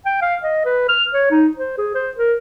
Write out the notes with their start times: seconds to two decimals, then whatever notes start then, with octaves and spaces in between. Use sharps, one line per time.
0.05 G5
0.21 F5
0.43 D#5
0.65 B4
0.89 F6
1.14 C#5
1.31 D#4
1.57 C5
1.78 G#4
1.94 C5
2.17 A#4